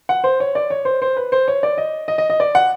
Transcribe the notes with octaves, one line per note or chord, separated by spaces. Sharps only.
F#5
C5
C#5
D5
C#5
C5
C5
B4
C5
C#5
D5
D#5
D#5
D#5
D#5
D5
F#5